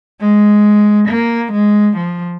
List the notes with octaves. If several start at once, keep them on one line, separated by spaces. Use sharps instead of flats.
G#3
A#3
G#3
F3